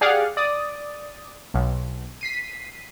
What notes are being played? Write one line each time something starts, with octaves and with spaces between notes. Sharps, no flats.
G4 G#4 D5 F5 F#5
D5 D#6
B1
B6 C7 D#7